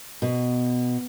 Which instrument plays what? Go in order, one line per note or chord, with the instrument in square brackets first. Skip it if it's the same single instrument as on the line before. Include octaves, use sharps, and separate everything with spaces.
[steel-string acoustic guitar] B2